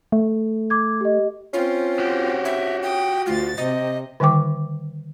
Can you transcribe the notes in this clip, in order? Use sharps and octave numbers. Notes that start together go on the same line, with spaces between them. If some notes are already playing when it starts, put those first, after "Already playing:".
A3
D6 G#6
G4 D#5
C4 C#4 F4
F#4 G4
E5
G5 D#6
D2 F4 A6
C3 D#5
D3 D#3 G3 G5 D6